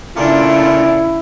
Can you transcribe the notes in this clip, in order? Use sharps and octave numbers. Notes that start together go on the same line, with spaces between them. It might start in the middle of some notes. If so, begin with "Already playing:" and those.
A#2 C#3 A3 D4 E4 F4